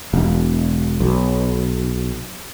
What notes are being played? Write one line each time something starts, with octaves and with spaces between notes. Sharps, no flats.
E1
B1